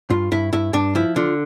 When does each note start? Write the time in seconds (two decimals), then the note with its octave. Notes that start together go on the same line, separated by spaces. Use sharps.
0.10 G2 F4
0.32 G2 E4
0.53 G2 E4
0.73 G2 D4
0.95 F3 E4
1.16 D3 F4